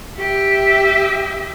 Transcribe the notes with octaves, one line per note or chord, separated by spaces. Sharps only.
G4 E5